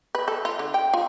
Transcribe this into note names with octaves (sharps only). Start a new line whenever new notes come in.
B4
A4
F4
D3
G5
F4